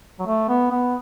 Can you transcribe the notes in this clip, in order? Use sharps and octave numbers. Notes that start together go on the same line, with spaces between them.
F#3
A3
B3
B3